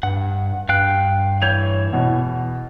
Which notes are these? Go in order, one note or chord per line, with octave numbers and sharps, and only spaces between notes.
G2 F#5
G2 F5 G5 F#6
E3 C#5 G6 G#6 F7
E2 B2